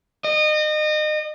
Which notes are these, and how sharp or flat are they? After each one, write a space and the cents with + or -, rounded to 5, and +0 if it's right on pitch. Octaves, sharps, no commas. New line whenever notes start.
D#5 -30